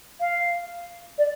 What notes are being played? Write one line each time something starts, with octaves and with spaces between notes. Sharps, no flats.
F5
D5